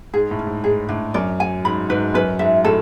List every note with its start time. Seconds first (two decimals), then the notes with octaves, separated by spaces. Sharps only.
0.14 G#2 G#4
0.31 A2
0.39 C#4
0.47 G#2
0.64 G#2 G#4
0.89 A2 D4
1.14 F#2 D5
1.40 G#5
1.65 G#2 B5
1.90 G#2 B4
2.14 F#2 B4
2.39 G#2 E5
2.64 A2 A4